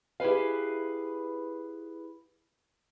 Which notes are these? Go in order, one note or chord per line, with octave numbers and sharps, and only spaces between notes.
E4 G4 G#4 B4 F5